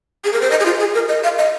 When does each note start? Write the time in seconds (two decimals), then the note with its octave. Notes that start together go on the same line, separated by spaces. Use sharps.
0.25 G#4
0.33 A#4
0.41 C5
0.51 D#5
0.60 G#4
0.66 F4
0.80 G#4
0.94 A#4
1.08 D#5
1.24 F5
1.38 D#5